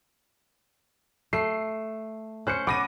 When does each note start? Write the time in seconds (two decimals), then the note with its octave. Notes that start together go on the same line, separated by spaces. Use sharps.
1.33 A3 C7
2.47 C#4 C5 F#6 C#7
2.67 B3 D6 A#6 D#7